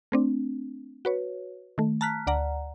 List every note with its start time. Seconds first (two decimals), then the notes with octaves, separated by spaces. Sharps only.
0.12 A3 C4 D4
1.05 F#4 B4 C#5
1.78 D#3 A3
2.01 A5 A#5 F6 F#6 B6
2.27 D2 D5 F#5 A#5